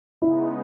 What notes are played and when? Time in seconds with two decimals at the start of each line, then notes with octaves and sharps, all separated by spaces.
0.21 C#3 G#3 B3 D#4 E4